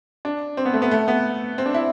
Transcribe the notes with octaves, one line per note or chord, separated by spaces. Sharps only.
D4
C4
B3
A3
B3
A3
B3
C4
D4
E4